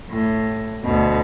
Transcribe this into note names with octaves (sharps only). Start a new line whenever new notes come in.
A2
D2 B2